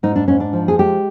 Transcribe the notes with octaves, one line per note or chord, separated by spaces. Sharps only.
G#2 D#4
D4
G#2 C#4
D4
F3
G#4
G#3 G4